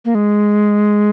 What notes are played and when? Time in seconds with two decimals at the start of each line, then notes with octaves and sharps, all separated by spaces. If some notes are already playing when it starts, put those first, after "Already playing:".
0.05 A#3
0.15 G#3